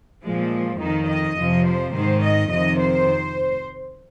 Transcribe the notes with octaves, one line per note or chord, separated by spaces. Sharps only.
A#2 F3 G#3
F2 D#3 D#4
D#5
F2 C3 F3
C5
G#2 D#3 C5
D#5
F2 C3 D#3 D#5
C5